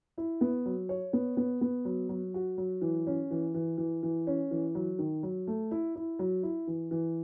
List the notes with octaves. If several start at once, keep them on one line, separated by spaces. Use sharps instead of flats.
E4
B3
F#3
C#5
B3
B3
B3
F#3
F#3
F#4
F#3
E3
C#4
E3
E3
E3
E3
C#4
E3
F#3
D#3
F#3
A3
E4
E4
F#3
E4
E3
E3